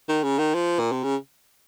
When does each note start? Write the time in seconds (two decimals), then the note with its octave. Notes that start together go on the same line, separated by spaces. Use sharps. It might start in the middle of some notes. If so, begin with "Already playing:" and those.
0.09 D#3
0.24 C#3
0.39 D#3
0.55 F3
0.79 A#2
0.92 C3
1.04 C#3